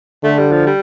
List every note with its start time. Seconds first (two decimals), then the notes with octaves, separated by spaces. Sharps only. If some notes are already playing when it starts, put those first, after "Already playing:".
0.24 D3 A3
0.38 G3
0.52 F3
0.66 G3